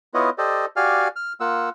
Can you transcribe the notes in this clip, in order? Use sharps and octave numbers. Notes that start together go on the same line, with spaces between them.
B3 E4 F4 B4 C#5 D#5
G4 A4 C5 D5 D#5
F#4 G4 D5 F5 G#5 F6
F6
A#3 F4 F#5 E6